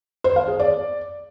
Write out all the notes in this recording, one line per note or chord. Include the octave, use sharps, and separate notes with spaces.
C5
F5
G#4
D5